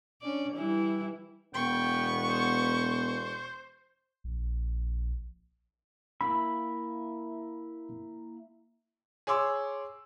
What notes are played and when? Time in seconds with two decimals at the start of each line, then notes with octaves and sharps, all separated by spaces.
0.22 C#4 D4 D5
0.54 E3 G3 E4
1.54 E1 B3 G5 C#6
2.28 C5
4.24 A#1
6.21 A#3 E4 E5 B5
9.27 G#4 C#5 C6 D6 E6